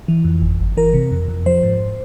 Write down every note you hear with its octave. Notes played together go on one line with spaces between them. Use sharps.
E3
F2
G1
G1
E3 A#4
C3
F2
F2
F3 C5
G#2